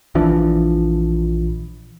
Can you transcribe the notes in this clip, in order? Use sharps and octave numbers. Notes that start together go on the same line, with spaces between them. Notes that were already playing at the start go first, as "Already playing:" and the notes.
A#1 E3 F3 D4